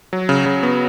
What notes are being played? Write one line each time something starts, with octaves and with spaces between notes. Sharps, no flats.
F#3
C#3
C#3
B3